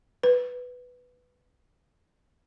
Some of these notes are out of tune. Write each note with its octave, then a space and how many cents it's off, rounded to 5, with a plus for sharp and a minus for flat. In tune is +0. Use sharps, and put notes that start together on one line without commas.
B4 +5